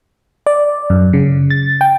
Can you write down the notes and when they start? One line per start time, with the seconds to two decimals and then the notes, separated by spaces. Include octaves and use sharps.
0.47 D5
0.90 F#2
1.13 C#3
1.50 A6
1.81 G5